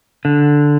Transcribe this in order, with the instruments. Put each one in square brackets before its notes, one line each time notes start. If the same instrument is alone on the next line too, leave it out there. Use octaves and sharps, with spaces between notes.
[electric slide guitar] D3